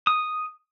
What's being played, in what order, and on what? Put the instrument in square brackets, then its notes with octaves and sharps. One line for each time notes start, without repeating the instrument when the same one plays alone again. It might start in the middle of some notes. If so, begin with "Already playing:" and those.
[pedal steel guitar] D#6